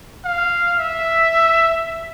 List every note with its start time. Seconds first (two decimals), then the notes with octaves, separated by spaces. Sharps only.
0.24 F5
0.78 E5